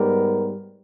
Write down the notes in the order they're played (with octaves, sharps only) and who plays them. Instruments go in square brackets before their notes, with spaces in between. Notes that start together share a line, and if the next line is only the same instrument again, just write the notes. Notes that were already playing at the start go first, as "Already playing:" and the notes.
Already playing: [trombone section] G#2 G3 B3 G4 A#4